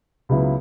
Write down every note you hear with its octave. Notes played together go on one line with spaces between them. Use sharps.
C#2 C#3 F#3 B3 E4